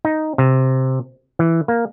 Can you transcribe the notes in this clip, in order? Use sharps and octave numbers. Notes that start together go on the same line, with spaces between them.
D#4
C3
E3
A#3